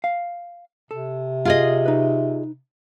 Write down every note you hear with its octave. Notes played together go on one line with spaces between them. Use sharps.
F5
C3 A4
F4 G#4 D#5
D#4 B4